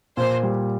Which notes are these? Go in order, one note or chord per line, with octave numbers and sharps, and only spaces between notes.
A#2 C5
G3